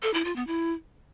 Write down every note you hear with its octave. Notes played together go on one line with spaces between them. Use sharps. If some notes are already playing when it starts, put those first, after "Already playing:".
A4
E4
F4
B3
E4